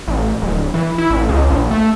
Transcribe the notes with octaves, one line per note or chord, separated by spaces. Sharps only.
A1
D1
E3
E4
A1
C#2
A#1
A3